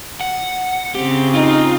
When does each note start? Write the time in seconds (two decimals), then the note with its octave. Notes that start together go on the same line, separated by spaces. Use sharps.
0.21 F#5
0.95 C#3 C4 G4
1.34 D#4 F4